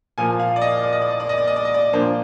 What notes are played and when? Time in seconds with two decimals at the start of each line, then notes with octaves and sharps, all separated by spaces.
0.18 A#2 F3 A#3 G#5
0.40 F5
0.56 D5
0.62 D#5
0.83 D5
0.93 D#5
1.02 D5
1.11 D#5
1.20 D5
1.29 D#5
1.38 D5
1.47 D#5
1.56 D5
1.65 D#5
1.74 D5
1.93 A#2 F3 A#3 D4 C5